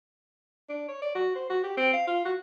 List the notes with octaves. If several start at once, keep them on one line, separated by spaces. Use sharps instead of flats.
D4
C#5
D5
F#4
C5
F#4
G4
C4
F5
F4
F#4